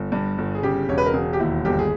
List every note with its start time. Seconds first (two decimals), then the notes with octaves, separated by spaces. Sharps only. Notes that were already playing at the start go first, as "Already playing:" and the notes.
Already playing: G1
0.12 G2
0.38 G1
0.55 G#4
0.63 C#3 G4
0.89 E1 C#5
0.98 B4
1.06 A#4
1.14 E1 G#4
1.33 G4
1.39 D#2 E4
1.65 G1 G4
1.79 G#4